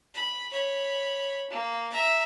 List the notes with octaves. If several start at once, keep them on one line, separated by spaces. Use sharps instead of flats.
B5
C#5 B5
A#3
E5 A#5